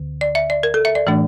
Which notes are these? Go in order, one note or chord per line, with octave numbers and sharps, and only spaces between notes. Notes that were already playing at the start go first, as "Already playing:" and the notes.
Already playing: D2 D3
D5
E5
D5
A#4
A4
E5
D5
A2 E3 A3 D4